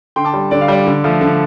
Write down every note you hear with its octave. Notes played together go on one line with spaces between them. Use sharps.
D3 G5 C6
A5 D6
G3
D3 D5
F5
G3 D5
D3
F3 A3
D3